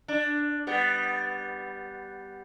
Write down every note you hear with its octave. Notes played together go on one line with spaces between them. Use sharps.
D4
G3 B3